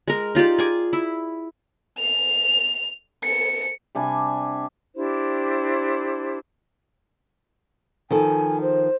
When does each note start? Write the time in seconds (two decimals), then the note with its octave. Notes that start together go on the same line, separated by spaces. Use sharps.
0.08 G#3 A#4
0.35 D#4 F4 G4 D5
0.58 G#4 G#5 D6
0.93 E4
1.99 F7
3.25 C#7
3.95 C3 G3 D4 G#5
4.95 D4 E4 G4 C5
8.10 D#3 F3 A4 G#5
8.62 C5